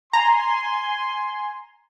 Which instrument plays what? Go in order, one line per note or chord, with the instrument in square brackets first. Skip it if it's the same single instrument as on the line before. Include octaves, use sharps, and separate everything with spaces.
[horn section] G#5 C6 [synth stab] A#5